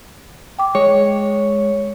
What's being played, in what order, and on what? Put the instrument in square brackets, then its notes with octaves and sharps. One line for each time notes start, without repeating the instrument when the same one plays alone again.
[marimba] G5 D6
[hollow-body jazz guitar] G#3 [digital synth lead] C#5